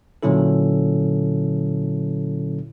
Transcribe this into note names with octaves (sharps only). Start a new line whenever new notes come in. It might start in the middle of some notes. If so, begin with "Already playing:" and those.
A#2 D3 F#3 C#4 E4 A4